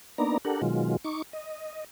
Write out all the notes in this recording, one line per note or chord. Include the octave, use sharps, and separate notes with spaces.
A#3 B3 D4 D#4 D5 A#5
D4 G4 A4 A#4 F#5
B2 D#3 F#3 G#3 F4
D#4 C#6 D6
D#5